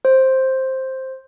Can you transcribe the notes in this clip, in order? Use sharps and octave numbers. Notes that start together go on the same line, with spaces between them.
C5